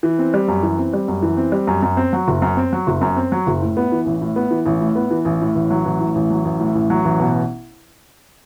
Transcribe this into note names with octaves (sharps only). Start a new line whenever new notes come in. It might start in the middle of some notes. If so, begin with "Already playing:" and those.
E3
C4
G3
F#2
E3
C4
G3
F#2
E3
C4
G3
F#2
F#2
C4
F#3
F#1
F#2
C4
F#3
F#1
F#2
C4
F#3
F#1
A2
B3
E3
A1
A2
B3
E3
A1
A2
B3
E3
A1
A2
A1
F#3
A1
A2
A1
F#3
A1
A2
A1
F#3
A1
B2